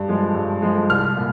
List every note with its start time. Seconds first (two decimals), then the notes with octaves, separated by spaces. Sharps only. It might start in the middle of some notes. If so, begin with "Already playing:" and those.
Already playing: G2
0.08 F3 G#3
0.35 G2
0.62 F3 G#3
0.89 C2 F6
1.17 A#2